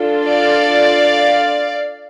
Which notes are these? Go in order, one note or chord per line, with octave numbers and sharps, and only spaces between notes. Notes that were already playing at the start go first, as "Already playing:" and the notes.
Already playing: D4 F4 A4
D5 F5